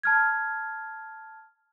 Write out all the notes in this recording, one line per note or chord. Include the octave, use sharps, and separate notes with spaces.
A5 F6 G#6